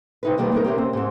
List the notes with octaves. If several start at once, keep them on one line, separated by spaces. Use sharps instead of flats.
C3 D#4 B4
B2 D#3 G3 G#3 A#3 B3
B3 D#4 A#4
C3 A#3 C#4 G4
C4
G#2 C4